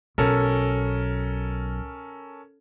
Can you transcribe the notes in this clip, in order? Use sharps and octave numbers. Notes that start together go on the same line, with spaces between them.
B1 C#4 A4 A#4